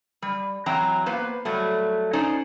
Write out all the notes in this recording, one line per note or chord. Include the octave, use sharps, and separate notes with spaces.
G3
E3 F#3 C4 F#4 G5 A#5
A#3 B3 B4 C5
F#3 G3 A3
C#4 D#4 C5 D5